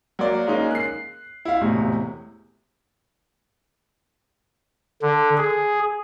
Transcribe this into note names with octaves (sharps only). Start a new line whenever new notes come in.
F#3 A#3 D5
G#3 A#3 C#4 D#4
F#6 C7
E4 F5
E1 A2 C3
D3
G#4